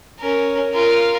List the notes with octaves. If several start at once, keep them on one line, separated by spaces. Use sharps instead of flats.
C#4 A#4
F4 A#4